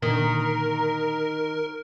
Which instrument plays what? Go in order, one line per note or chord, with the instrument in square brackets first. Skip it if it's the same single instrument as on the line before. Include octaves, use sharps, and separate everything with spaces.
[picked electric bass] A#2 D3 [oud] D#3 [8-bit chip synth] A#4 [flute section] A#5